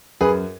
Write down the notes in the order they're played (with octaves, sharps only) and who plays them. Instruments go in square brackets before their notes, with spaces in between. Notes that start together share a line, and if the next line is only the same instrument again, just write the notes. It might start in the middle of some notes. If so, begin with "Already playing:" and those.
[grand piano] F#2 G#4 B4